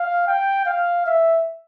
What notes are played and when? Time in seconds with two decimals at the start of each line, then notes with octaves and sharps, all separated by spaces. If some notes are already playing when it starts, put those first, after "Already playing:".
Already playing: F5
0.27 G5
0.65 F5
1.06 E5